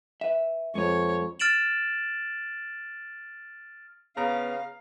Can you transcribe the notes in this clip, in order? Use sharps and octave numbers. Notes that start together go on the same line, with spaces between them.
B4 E5
F2 G#3 B4 C#5
F6 A6 D7 E7 F#7
C#3 B3 F5 A#5